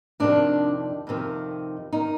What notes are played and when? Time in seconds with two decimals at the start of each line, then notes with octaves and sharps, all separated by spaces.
0.20 F2 C3 D#3 D4
1.07 F2 C3 D#3
1.93 D#3 D#4